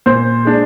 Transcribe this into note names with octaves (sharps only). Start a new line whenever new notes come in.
A#2 C5
G#3 D4